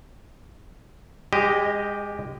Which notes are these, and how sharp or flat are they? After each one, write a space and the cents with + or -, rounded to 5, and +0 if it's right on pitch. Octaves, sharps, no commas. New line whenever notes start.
G#3 -30 G4 +0 D#5 +0